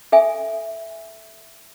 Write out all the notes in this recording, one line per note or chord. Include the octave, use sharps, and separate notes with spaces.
A4 E5 G#5